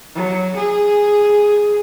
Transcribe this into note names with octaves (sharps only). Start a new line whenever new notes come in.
F#3
G#4